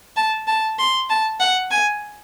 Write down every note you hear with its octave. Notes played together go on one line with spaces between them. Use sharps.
A5
A5
C6
A5
F#5
G#5